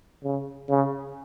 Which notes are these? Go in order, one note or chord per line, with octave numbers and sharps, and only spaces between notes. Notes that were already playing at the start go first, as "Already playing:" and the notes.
C#3
C#3